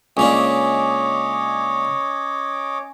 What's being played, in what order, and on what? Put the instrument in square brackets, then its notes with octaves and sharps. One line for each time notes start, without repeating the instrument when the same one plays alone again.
[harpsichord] C#2 A#3 D4 [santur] C#4 [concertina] C#5 D#5 D6